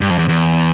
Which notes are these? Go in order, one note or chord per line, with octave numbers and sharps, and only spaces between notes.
G2
F2
E2
E2